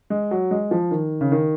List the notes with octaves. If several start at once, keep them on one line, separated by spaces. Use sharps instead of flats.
G#3
F#3
G#3
F3
D#3
C#3
D#3